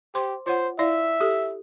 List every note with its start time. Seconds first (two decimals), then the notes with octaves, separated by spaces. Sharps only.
0.15 G4 C5 C6 D6
0.46 F4 C5 C#5 F#5
0.79 E4 D5 E5 F5
1.21 G4 A4